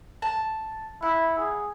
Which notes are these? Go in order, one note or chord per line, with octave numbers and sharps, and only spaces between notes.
A5
E4 F#5
G#4